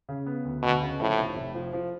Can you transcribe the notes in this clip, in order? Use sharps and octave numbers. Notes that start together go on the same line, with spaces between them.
C#3
B3
D2
D2 B2
C#3
A2 F3
F1
F1
F3
F3